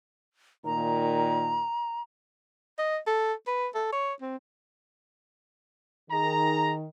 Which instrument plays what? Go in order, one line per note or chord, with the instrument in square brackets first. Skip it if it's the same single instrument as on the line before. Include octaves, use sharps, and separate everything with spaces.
[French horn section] A#2 D#3 [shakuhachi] A#5
[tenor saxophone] D#5
A4
B4
A4
C#5
C4
[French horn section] D#3 [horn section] G#4 A#5